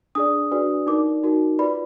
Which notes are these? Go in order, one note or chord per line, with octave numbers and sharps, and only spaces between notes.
D4 G#4 D5 D#6
D4 F#4 B4 D5
D#4 A#4 D5 D6
D#4 F#4 A#4
F4 B4 D5 B5